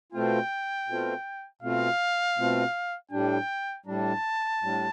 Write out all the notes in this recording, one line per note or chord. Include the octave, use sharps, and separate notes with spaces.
B2 A3 C4 F4 G5
B2 A3 C4 F4
B2 A3 C4 F4 F5
B2 A3 C4 F4
A2 G3 D4 G5
A2 G3 D4 A5
A2 G3 D4